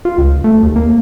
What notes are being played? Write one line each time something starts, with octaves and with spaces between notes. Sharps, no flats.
F4
C#2
A3
D#2
A#3